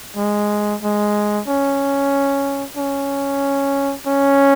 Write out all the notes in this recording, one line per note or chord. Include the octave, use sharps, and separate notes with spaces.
G#3
G#3
C#4
C#4
C#4